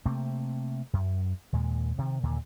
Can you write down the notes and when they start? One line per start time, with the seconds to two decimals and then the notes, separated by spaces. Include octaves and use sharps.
0.06 C3 A3 A#3 C4
0.93 F#2
1.53 D#2 A#2 G#3
1.98 C3 D#3
2.23 D#2 A#2 D3